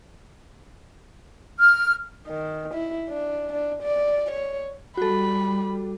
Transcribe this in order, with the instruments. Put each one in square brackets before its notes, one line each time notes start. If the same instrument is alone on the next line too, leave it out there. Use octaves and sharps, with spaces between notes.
[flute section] F6
[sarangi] D#3
E4
D4
D4
D5
C#5
[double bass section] G3 [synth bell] F#4 A4 [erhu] B5